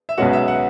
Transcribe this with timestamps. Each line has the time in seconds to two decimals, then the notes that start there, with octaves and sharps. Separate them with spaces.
0.09 E5
0.18 B1 B2 G#3 C#4 F#4 F#5
0.33 E5
0.48 F#5